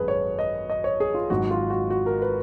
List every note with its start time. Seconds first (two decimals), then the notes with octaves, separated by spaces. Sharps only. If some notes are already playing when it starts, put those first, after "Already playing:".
Already playing: G#1 F#2 G#4 B4
0.08 C#5
0.39 D#5
0.70 D#5
0.84 C#5
1.00 G#4
1.14 F4
1.30 G#1 G#2 F#3 F#4
1.51 F4
1.70 F#4
1.90 F#4
2.06 A#4
2.22 B4